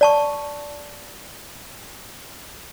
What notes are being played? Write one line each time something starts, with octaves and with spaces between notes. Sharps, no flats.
D5 A5 C#6